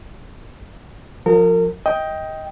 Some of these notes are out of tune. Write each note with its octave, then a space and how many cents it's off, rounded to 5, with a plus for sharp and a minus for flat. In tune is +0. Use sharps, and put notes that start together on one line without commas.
F3 +25 A#4 -35
D#5 +20 G5 +0